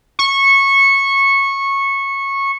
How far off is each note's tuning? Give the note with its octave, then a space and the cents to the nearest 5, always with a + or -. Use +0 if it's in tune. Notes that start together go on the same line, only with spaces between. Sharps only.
C#6 -15